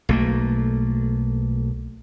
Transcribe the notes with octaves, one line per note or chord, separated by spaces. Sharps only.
B1 A3 A#3